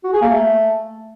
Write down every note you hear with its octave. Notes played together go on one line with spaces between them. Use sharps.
F#4
G#4
A#3
A3